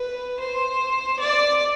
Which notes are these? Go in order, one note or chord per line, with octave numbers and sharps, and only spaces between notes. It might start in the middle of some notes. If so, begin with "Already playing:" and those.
Already playing: B4
C5
D5